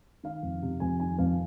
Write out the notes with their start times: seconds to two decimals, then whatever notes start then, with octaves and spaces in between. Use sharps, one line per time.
0.23 D#3 F5
0.43 F2
0.62 C3
0.80 F2 G#5
1.00 D#3 G#5
1.18 F2 F5